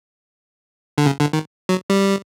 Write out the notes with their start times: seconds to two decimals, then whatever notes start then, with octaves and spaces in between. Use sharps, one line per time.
0.98 D3
1.06 C#3
1.20 D3
1.33 D#3
1.69 F#3
1.90 G3